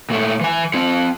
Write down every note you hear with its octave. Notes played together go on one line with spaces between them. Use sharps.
A#2 A3
E3 G#5
C4 F4